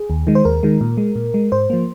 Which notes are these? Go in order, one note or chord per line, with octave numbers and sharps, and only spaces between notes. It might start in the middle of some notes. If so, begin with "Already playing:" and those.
Already playing: G#4
D#2
D#3 G#3
C5
D#2 A#4
D#3 G#3
A#2
G#3
A#2
G#3
G#2 C5
F3 A#3